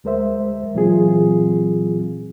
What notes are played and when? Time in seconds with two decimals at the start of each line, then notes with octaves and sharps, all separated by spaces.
0.04 D2 G#3 A#4 C5 E5
0.74 A#2 E3 F#3 C4 F4 G#4